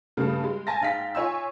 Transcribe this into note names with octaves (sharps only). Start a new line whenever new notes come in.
G2 C#3 G3 A3
G3 G#3
G#5 A5 A6 A#6
G#2 F5 G5 B6
F4 C#5 G#5 C6 E6